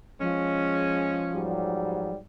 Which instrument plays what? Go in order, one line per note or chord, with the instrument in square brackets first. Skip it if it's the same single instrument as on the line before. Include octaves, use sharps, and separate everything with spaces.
[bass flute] F3 [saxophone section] G#3 C#4
[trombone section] G#2 F#3 G3